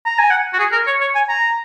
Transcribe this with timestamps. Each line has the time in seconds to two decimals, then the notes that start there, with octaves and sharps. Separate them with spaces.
0.05 A#5
0.19 G#5
0.30 F#5
0.53 F#4
0.59 G#4
0.72 A#4
0.86 C#5
1.01 C#5
1.15 G#5
1.29 A#5